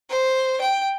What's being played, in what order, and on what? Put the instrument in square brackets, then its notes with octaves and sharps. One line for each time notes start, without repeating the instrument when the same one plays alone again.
[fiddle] C5
G5